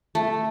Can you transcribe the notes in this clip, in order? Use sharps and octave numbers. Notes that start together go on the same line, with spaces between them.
A3